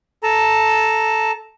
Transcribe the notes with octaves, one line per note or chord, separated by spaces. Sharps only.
A4 A5 A#5